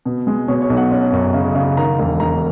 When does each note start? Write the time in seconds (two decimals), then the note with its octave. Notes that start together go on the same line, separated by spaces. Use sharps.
0.05 B2
0.27 G#3
0.48 B2 C#5
0.62 C#5
0.70 B1
0.77 F#5
0.91 C#4
1.12 F#2
1.34 C#3
1.55 C#3
1.77 D#3 A#5
1.98 E1
2.20 E1 A#5